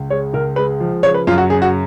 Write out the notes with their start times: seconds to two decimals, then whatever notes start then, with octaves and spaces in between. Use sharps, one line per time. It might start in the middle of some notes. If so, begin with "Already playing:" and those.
Already playing: C#2
0.10 G#3 C#5
0.33 C#2 A#4
0.56 G#3 B4
0.80 F3
1.03 C#3 C#5
1.14 B4
1.27 F#2 F4
1.38 F#4
1.50 C#3 G#4
1.62 F#4